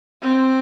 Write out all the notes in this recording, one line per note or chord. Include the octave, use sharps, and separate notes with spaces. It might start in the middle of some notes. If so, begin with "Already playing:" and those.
C4